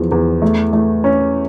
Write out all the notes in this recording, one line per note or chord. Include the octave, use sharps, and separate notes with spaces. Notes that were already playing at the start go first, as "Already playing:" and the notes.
Already playing: E2 F3
E2
A3
A3
C#4